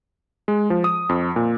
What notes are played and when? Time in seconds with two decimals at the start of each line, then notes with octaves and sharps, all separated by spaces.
0.48 G#3
0.70 F3
0.84 D#6
1.09 F2
1.36 A#2